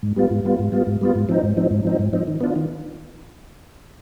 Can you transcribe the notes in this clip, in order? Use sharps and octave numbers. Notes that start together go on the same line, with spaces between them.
G#2
G3 B3 F4
G#2
G3 B3 F4
G#2
G3 B3 F4
G#2
G3 B3 F4
G#2
F3 C4 D#4
G#2
F3 C4 D#4
G#2
F3 C4 D#4
G#2
F3 C4 D#4
D#3
B3 D4 F4
D#3